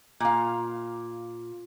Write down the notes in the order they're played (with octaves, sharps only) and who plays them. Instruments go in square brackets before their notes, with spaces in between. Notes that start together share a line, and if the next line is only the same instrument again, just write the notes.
[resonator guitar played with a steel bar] A#2 F5